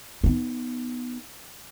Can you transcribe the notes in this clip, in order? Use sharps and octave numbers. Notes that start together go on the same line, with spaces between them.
B3 D#4